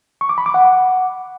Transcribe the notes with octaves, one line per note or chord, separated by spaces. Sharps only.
C#6
D6
B5
D6
F#5